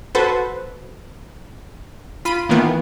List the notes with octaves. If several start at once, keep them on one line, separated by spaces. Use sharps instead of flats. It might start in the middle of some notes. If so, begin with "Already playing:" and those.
F#4 A4 B4 C5
F4 B5 D#7
D#3 E3 A#3 B3 F4